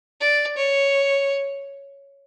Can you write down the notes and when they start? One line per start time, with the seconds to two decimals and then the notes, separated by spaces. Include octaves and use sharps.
0.20 D5
0.57 C#5